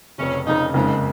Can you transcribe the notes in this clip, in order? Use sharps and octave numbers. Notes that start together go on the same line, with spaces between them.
F1 F2 C#3 C#4
F1 F2 C#3 D#4
F#1 F2 C#3 G#3 D#4